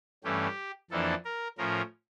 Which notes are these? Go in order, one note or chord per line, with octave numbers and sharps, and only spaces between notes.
G2 E3 A3 C#4 G4
F2 E3 A#3 D4 A4
A#4
A2 F3 C#4 A#4